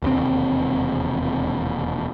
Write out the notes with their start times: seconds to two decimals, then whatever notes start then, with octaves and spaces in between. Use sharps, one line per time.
0.02 E1 D#2 C3 C4